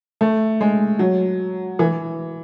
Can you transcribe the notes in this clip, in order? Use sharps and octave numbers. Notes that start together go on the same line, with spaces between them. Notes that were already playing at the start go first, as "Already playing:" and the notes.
A3
G#3
F#3
E3